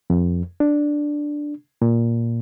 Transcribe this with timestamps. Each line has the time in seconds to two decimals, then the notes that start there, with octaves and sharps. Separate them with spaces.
0.10 F2
0.60 D4
1.82 A#2